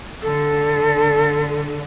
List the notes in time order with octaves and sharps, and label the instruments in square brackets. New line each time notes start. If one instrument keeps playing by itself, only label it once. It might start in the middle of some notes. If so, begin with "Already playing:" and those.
[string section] D3 [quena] A4